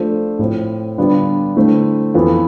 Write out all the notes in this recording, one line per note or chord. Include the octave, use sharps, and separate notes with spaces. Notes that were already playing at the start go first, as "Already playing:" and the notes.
Already playing: F3 A3 D4 A4 C5
A2 F3 C4
D3 G3 B3 D4 F4
D3 A3 C4 E4
F2 E3 B3 F4 A4